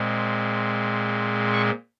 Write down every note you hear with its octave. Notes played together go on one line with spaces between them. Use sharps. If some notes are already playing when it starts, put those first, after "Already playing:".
Already playing: A#2 G#3 C4
C#6